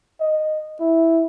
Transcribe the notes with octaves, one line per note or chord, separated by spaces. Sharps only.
D#5
E4